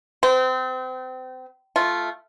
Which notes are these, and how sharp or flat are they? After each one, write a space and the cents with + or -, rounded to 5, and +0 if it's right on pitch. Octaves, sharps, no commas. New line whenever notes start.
C4 -30 C5 -35
A3 -10 F4 -5